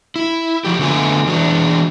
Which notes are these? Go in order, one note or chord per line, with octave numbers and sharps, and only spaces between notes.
E4
F3 G4
D3 G#3 A3 B3 F4 G#5
E3 G#3 D4 F#4